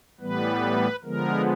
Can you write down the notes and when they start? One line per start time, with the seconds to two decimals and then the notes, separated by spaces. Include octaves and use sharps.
0.20 A2 E3 G3 B3 B4
1.04 D3 F3 G#3 B3 A#4